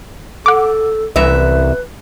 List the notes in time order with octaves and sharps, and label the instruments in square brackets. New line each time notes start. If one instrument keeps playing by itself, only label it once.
[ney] A4 [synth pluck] F#5 D6
[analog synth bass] C2 [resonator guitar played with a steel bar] F#2 E3 E5 [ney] B4